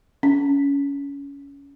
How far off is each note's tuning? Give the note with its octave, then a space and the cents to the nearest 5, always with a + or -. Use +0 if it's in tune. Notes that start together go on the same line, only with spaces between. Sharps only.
C#4 +20